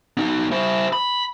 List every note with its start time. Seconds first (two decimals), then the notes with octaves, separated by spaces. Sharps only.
0.17 B3 D#4
0.52 E4 C5
0.93 B5